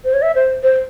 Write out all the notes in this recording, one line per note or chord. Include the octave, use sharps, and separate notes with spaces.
C5
C#5
E5
C5
C5